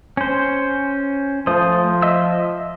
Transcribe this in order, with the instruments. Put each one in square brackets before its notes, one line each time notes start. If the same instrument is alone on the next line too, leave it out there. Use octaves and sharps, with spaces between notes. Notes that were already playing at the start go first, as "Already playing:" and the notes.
[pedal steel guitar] C#4 C5
[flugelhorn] F3 [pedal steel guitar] A3 C5 D#6
[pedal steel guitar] D#5 E5 E6